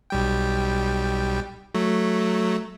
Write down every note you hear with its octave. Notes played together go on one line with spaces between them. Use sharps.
B1 G3 G5
F#3 A3